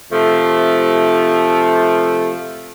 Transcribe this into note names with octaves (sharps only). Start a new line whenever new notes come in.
C3 F3 A3